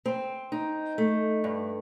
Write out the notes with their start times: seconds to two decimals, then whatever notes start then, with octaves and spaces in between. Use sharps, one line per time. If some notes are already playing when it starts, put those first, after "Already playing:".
0.06 C4
0.52 D#4
0.98 A3
1.44 G2